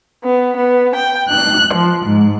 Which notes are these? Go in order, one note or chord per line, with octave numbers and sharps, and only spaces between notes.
B3
B3
G5
F#6
F3
G#2